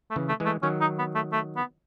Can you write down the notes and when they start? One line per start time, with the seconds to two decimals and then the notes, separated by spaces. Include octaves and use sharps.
0.11 A3
0.16 C#3 E3
0.29 A3
0.40 E3 G#3
0.46 A3
0.63 D#3 F#3 C#4
0.81 D#4
0.99 B3
1.15 A3
1.33 A3
1.56 B3